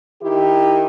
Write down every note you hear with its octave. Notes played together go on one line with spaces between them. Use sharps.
D#3 E4 G4